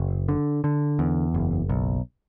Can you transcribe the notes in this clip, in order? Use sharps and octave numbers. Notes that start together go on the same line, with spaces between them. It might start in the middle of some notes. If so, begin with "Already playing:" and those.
Already playing: F#1
D3
D3
E2
F#1
B1